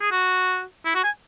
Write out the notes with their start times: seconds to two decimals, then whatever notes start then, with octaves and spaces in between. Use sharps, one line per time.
0.01 G#4
0.11 F#4
0.85 E4
0.95 F#4
1.04 G#5